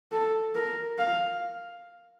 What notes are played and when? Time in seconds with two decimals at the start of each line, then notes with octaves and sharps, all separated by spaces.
0.12 A4
0.55 A#4
0.99 F5